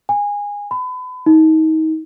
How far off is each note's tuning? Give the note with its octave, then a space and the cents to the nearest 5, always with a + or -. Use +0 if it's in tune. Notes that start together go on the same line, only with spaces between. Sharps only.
G#5 -20
B5 +35
D#4 +30